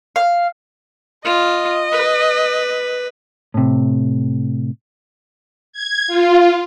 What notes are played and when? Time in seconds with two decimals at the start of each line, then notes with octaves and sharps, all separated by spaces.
0.16 F5
1.25 F4 D#5
1.92 B4
3.54 A2 C3
5.73 G#6
6.07 F4